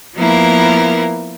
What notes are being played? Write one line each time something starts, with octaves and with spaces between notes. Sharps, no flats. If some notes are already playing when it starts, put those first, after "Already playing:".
F3 A#3 B3 E4 A#4